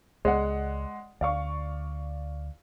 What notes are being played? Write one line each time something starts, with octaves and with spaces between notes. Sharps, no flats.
C#2 G#3 D5 F#5
D2 D5 F5 C#6